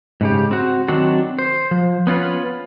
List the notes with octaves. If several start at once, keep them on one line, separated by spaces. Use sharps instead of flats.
G#2 C#3 G4
C4 F#4
D#3 F#3 C4 D4 F#4
C5
F3
B3 C#4 F4 B4